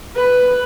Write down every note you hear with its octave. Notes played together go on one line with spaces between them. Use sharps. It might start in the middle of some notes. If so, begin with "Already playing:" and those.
B4